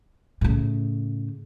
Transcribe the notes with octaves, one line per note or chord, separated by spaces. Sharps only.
A2 C#3